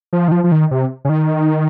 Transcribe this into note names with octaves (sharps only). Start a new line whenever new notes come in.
F3
D#3
F3
F3
D#3
C3
C#3
D#3